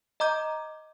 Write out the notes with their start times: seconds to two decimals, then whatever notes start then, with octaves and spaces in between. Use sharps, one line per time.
0.20 D#5 A#5 D6 G6